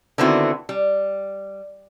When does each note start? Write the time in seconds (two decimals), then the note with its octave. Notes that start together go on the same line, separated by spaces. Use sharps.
0.18 D3 D#3 B3 C4 E4 F#4
0.69 G3